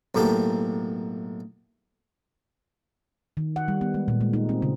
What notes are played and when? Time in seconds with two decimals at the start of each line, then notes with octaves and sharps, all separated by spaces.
0.15 B1 A2 A#3 G4 A4
3.37 D#3
3.56 F#5
3.68 G3
3.81 B3
3.94 G#3
4.08 A#2
4.21 G#3
4.33 D#4
4.49 C4
4.62 C#3